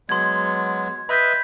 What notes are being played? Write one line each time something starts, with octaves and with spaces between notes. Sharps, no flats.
F#3 G#3 B3 C6 G#6
B4 D#5 E5 B5 G6 B6